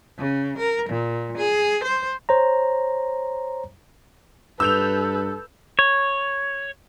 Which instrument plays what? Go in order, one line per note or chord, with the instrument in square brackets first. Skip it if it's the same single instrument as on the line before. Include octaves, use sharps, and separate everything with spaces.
[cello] C#3
A#4
A#2
G#4
C5
[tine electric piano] C5 C#5 A#5
[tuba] G2 [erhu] A4 [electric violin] B4 [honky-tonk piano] E6 G6 F7
[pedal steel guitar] C#5